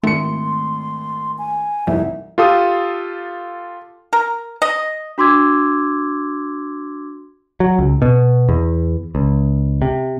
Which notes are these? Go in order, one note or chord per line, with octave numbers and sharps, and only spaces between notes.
G#1 A3 C6 C#7
G#5
C2 F2 D#4 E5
F4 G4 A4 F5 D#6
A#4
D#5
D4 F#4 C6 D6 E6 G#6
F#3
C#2
B2
E2
C#2
C3